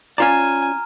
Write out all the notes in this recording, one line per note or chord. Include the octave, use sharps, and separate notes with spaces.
C#4 F4 D5 G#5 A#5 F6